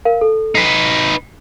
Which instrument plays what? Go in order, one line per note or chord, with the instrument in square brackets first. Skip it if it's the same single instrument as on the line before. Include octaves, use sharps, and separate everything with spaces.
[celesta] A#4 F5
A4
[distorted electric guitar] D#4 B4 [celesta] B6 C7